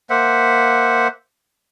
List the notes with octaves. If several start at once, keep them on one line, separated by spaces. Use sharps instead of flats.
A#3 C5 E5 F#5